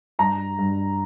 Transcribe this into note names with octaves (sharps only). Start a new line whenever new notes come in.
G2 A#5
G2